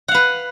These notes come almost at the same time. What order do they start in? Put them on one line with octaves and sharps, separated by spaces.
F#5 F5 B4